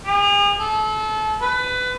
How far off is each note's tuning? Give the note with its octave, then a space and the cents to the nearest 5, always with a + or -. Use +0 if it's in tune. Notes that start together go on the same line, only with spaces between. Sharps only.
G#4 -40
A4 -30
B4 +20